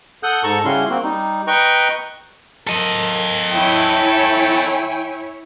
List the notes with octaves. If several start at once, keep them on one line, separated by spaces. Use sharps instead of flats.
A4 F#5 D#6 F#6 G6
G#2 A4 A5 A#5 C#6
C#3 G3 C#4 E4 F#4 C6
A#3 C4 F#4
G3 D#4
B4 D#5 G5 A#5 C#6
A4 A#4 D#5
E4 C#5 G5 G#5